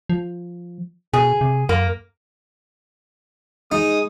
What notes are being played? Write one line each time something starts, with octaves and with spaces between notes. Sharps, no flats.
F3
B2 G#4
C3
F#2 A#3
G#3 D#4 D#6